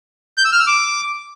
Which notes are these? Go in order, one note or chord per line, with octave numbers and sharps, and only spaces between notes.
G6
E6
F6
E6
D6